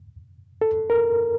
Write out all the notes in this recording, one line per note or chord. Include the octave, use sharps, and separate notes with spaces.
A4
A#4